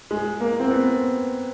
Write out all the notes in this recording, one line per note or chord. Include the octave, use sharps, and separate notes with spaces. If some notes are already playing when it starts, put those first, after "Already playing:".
G#3
A#3
C4
B3